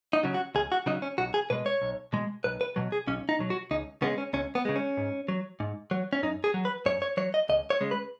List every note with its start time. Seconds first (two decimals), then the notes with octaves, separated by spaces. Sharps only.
0.13 D#4
0.23 C#3 F#3
0.34 F#4
0.55 C#2 G#4
0.72 F#4
0.86 C#3 F#3 D#4
1.02 C#4
1.18 B1 F#4
1.34 G#4
1.50 B2 G#3 B4
1.66 C#5
1.82 B1
2.13 B2 G#3
2.44 B1 B4
2.61 B4
2.76 B2 F#3
2.92 G#4
3.07 B1 C#4
3.29 D#4
3.39 B2 F#3
3.50 F#4
3.71 C#2 D#4
4.02 C#3 G#3 B3
4.18 C#4
4.33 C#2 C#4
4.55 B3
4.65 C#3 G#3
4.76 C#4
4.97 G#2
5.28 F#3
5.60 G#2
5.91 F#3
6.13 C#4
6.23 F#2 D#4
6.44 G#4
6.54 F#3
6.65 B4
6.86 F#2 C#5
7.02 C#5
7.17 F#3 C#5
7.34 D#5
7.49 C#2 D#5
7.70 C#5
7.81 C#3 G#3
7.91 B4